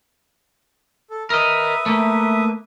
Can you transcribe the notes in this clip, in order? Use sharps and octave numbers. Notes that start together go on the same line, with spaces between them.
A4
A#4 B4 D#5 E5 D#6
A3 A#3